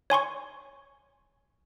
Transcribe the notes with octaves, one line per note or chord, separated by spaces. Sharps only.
C#5 G#5 C6 C#6